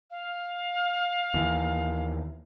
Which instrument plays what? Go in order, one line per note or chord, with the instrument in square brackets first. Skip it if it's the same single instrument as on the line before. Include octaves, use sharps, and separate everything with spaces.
[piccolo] F5
[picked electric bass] D#2 E3